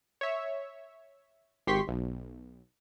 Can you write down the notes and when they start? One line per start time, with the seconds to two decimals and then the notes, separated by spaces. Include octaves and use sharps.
0.21 C#5 E5
1.67 G#1 G4 C6 C#6 B6
1.88 B1